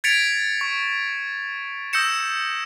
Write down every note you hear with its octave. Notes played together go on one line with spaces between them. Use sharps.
G#6 A6 B6 C#7 D7 F7
C#6
D#6 E6 G6 A#6 C#7 E7